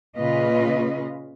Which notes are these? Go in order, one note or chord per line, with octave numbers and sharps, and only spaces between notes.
A#2 C#3 C#4 F4 B4 D#5